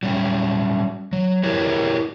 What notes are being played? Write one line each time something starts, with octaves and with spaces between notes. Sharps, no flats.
F#3 G3 C#4
F#3
E4 G4 A#4 B4 C#5